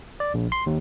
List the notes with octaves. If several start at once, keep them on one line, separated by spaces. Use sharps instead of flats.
D5
A#1
C6
D#2